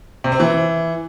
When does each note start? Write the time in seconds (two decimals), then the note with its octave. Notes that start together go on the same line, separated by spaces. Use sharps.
0.24 C3
0.32 C4
0.40 E3